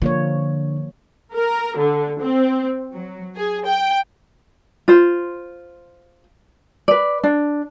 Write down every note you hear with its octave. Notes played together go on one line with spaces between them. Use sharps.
D3 F3 A#3 C#5
A#4
D3
C4
F#3
G#4
G5
F4 C5
B4 D5
D4